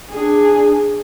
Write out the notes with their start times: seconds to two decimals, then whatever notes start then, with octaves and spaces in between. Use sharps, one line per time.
0.11 D4 G#4